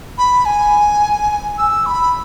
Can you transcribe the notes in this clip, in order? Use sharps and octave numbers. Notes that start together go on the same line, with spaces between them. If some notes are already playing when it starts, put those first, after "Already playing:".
B5
G#5
E6
B5